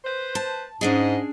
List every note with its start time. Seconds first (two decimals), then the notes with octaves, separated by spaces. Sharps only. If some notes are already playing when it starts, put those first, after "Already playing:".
0.04 B4 C5
0.35 A5
0.81 G#2 C#4 D4 G#4 D#5